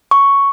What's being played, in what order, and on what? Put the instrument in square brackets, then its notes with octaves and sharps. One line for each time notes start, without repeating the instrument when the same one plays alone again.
[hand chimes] C#6